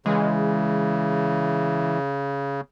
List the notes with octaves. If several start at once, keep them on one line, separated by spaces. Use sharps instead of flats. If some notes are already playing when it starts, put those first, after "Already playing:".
C#3 E3 G#3